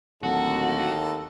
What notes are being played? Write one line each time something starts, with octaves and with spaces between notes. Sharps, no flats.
D1 D#2 F#4 A4